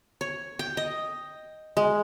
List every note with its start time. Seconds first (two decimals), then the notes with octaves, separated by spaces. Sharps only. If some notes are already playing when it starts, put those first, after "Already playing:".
0.21 C#5
0.59 G5
0.77 D#5
1.77 G#3